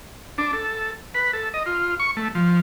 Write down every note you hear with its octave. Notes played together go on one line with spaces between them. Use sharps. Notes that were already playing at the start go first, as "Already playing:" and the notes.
D4
A4
B4
A4
D#5
F4
C#6
A3
F3